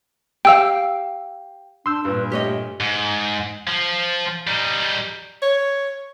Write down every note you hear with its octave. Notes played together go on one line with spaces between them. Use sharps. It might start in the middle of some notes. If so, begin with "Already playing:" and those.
G4 F5 G5 E6
D4 C6 E6 G6
G2 A#2 B4
A3 G4 C#5 D#5
G#2
F3
G3 D#4
C#5